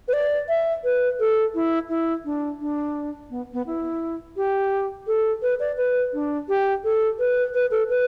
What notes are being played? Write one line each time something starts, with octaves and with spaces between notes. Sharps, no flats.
B4
D5
E5
B4
A4
E4
E4
D4
D4
B3
B3
E4
G4
A4
B4
D5
B4
D4
G4
A4
B4
B4
A4
B4